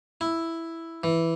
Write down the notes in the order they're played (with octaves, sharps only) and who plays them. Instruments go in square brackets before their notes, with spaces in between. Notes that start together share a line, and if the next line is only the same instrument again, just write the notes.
[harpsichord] E4
E3